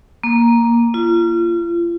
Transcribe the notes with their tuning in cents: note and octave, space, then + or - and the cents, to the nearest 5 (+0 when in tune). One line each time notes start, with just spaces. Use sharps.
A#3 +5
F4 -35